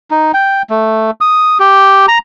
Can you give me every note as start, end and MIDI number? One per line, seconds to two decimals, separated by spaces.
0.11 0.32 63
0.34 0.62 79
0.70 1.11 57
1.21 1.58 87
1.60 2.06 67
2.08 2.18 82